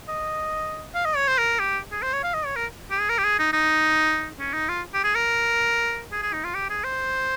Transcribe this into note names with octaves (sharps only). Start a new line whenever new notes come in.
D#5
F5
D#5
C#5
C5
A#4
G4
G#4
C5
C#5
F5
D#5
C#5
A#4
G4
G#4
A#4
G4
G#4
D#4
D#4
C#4
D#4
F4
G4
G#4
A#4
G#4
G#4
D#4
F4
G4
G#4
C5